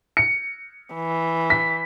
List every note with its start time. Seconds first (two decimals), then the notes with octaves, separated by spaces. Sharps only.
0.17 C#7
0.94 E3
1.50 B6